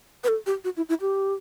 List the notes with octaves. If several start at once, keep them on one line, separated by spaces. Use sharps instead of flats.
B4
A4
G4
F#4
E4
E4
G4